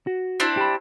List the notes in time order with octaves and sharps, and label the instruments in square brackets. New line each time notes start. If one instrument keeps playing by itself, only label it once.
[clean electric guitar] F#4
[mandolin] C4 D4 E4
[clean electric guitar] G4 B5